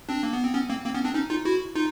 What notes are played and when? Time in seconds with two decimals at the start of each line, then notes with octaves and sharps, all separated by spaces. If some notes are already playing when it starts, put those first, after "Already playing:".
0.09 C4 D4
0.23 A#3
0.33 B3
0.44 C4
0.54 B3 C#4
0.69 A#3 C4
0.84 A#3 C4
0.94 B3 C#4
1.05 C4 D4
1.14 C#4 D#4
1.30 D#4 F4
1.45 E4 F#4
1.75 D#4 F4